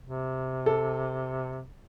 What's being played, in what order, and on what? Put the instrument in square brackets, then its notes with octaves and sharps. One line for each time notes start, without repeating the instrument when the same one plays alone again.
[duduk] C3
[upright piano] A4